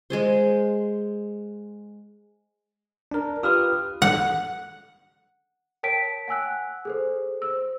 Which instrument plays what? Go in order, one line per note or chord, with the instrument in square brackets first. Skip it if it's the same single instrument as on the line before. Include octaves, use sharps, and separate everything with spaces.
[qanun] G#3 G#4 C5
[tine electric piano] D4 A#4
[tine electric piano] F4 G4 B4 [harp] D#6 F6
[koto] F#5
[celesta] A#4 C#5 G5 A5 B6 D7
F#5 G#5 E6 F#6
G#4 A4 C5
C5 E6